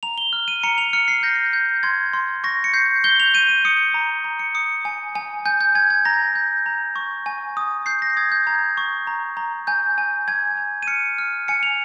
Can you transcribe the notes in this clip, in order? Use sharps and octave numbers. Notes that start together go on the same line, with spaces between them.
A#5 F7
G7
F6
D#7
A#5 C#7
F7
F6 C#7
C7
G6 A#6
G6
C6 G#6
C6
C#6 A#6
C#7
G6 C7
G6 G7
F7
G6 D#7
D#7
D#6 C#7
A#5
A#5
C#7
D#6 C#7
G#5
G#5
G#5 G6
G6
G#5 G#6
G#6
A#5 A#6
G6
A#5
C#6
G#5
D#6
G6 C7
A#6
D#6 G#6
G6
A#5 G#6
C#6
A#5
A#5
G#5 G6
G#5
G#5 G#6
G#5
D#7
F6 C#7
F6
G#5 C#7
F7